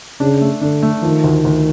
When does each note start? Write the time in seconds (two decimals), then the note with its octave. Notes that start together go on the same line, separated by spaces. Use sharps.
0.20 C#3 D4
0.41 A3
0.62 D3 D4
0.83 A3
1.02 D#3 F3
1.24 D2
1.45 D2